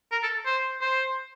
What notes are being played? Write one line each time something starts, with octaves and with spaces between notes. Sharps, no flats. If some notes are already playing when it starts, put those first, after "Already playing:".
A#4
A4
C5
C5